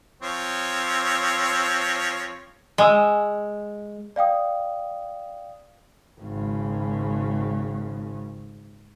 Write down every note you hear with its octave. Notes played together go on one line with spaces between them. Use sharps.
F3 C4 C#5
G#3 G#5 D#6 E6
D5 F5 G5 D#6
G#1 C#3